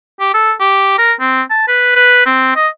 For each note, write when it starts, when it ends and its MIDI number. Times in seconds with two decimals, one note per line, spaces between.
0.20 0.30 67
0.34 0.52 69
0.60 0.97 67
0.98 1.13 70
1.20 1.42 60
1.50 1.63 81
1.68 1.92 71
1.96 2.24 71
2.26 2.55 60
2.56 2.68 75